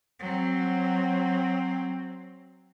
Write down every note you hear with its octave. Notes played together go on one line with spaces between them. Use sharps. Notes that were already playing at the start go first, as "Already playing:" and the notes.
F#3 C4